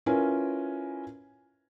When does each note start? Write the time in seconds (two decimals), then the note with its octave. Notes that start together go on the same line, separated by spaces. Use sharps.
0.06 C#4 E4 F4 A#4 B4 G#5